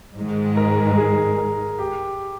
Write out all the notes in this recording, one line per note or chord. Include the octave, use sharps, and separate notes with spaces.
G#2 D#3 G#3
A#4
A#4
G#4
A#4
G4